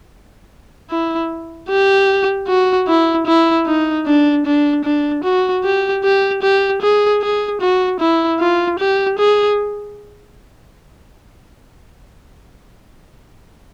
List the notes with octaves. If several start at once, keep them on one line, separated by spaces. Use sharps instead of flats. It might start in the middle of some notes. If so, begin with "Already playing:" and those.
E4
G4
F#4
E4
E4
D#4
D4
D4
D4
F#4
G4
G4
G4
G#4
G#4
F#4
E4
F4
G4
G#4